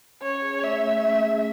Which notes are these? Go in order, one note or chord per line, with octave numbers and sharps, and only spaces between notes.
C#4 C#5
G#4
A3 E5
A3
C#4
G#4